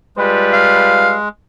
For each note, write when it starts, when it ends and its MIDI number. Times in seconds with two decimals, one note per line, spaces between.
0.17 1.16 55
0.17 1.29 56
0.17 1.16 65
0.17 1.16 71
0.53 1.13 77